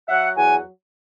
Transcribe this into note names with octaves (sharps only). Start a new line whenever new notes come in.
F#3 E5 F#5
E2 F#5 G#5